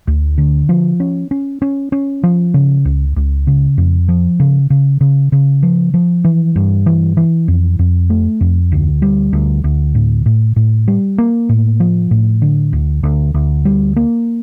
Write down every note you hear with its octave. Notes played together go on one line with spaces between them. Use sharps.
D2
D3
F3
C#4
C#4
C#4
C#4
F3
C#3
C#2
C#2
C#3
F2
F3
C#3
C#3
C#3
C#3
F3
F3
E3
G2
E3
E3
F2
F2
A3
F2
D2
G3
D2
D2
A2
A2
A2
G3
A#3
A2
F3
A2
D3
D2
D2
D2
G3
A#3